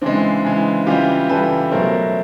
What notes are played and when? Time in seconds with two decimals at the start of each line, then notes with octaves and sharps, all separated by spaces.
0.01 C#3 E3 G#3 C4 D4
0.44 C#3 E3 G#3
0.87 C#3 E3 G3 F4 G4
1.29 C#3 E3 G3 A4 B4
1.71 B2 F#3 A3 A#4 C5